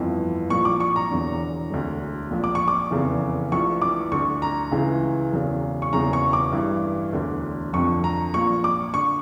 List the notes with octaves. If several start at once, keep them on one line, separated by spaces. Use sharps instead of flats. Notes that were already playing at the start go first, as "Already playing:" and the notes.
Already playing: G1 F2 E3
A#1 A#2 C#6
D6
C#6
A#5
E1 E2 D3
E1 D2 D3
A#1 A#2
D6
C#6
D6
F1 E2 C#3 E3
A#1 A2 E3 C#6
D6
D2 D3 C#6
A#5
C#2 C#3 E3
E1 E2 C#3
C#6
E1 E2 C#3 E3 A#5
C#6
D6
A1 G2 E3
E1 D2 D3
F1 F2 D3 C#6
A#5
A#1 A#2 C#6
D6
D3 C#6